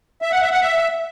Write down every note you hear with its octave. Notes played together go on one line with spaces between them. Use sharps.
E5
F#5
E5
F#5
E5